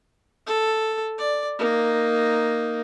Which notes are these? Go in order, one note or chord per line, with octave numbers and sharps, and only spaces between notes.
A4
D5
A#3 D#4